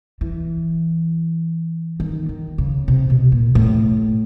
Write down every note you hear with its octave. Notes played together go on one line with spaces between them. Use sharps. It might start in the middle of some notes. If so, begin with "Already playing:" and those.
E3
D#3
D#3
C#3
C3
B2
A#2
A2